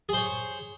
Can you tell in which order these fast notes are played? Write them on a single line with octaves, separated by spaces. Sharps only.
G#4 C5 C#5